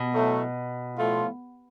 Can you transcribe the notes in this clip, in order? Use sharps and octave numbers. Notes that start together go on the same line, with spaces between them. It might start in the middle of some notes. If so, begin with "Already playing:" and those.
Already playing: B2
A2 F#3 A3
A2 F3 A3 F4